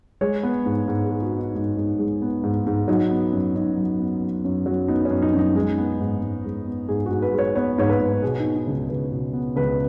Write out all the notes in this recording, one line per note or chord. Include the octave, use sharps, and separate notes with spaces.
G#3 C#5
B3
G#2
G#2
G#4
G#3
F#4
B3
D#4
G#2 D#4
G#2
G#3
B3
G#2
G#2
F#3 D#4
B3
F#2
F#2 D#4
F#3
B3
F#2
F#2
F#3
B3 D#4
C#4
F#2
D#4
F#2
D#4
G#3
B3
G#2
G#2
G#3
B3
G#2 G#4
G#2 F#4
B4
G#3
C#5
B3 C#5
G#2 C#5
B4
G#2
B2 G#4
B3 D#4
D#4
C#2
C#2 B4
B2
B3
C#2 B4